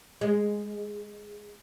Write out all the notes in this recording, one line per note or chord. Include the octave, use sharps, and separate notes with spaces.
G#3